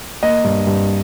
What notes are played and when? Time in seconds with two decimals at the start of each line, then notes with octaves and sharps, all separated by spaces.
0.23 A#3 D#5
0.44 G2
0.67 G2